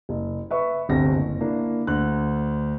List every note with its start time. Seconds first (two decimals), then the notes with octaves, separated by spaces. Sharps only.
0.09 F#1
0.51 B4 E5 C#6
0.89 D1 G1 C3 C4 A#6
1.15 F#1
1.41 A#3 D4 E4
1.87 D2 D3 F#6